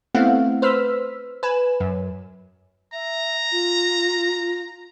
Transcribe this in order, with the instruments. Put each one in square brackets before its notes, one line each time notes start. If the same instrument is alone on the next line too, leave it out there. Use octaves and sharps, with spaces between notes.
[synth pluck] A3 B3 C4 E4 F5 F#5
B4 C5 E6 F6 B6
B4 G#5 E7
F#2
[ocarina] E5 [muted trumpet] A#5
[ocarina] F4